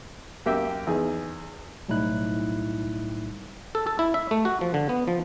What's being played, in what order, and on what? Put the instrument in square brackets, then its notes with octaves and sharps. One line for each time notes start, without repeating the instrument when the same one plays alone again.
[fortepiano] F#2 A#3 G4 E5 G5
E2 D#4 G#4
[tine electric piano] B1 A2 G3 D#4 E4 F#6
[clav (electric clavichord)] A4
A4
E4
E5
A3
F#4
F3
D3
B3
F3